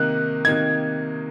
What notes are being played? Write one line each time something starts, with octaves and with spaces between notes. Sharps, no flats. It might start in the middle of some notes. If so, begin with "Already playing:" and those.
Already playing: C3 D#3 A#3 D#4 F#6
C3 D#3 A#3 D#4 G#6